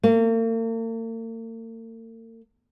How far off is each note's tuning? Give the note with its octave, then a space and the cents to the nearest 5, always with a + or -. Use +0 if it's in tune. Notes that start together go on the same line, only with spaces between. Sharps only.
A#3 -45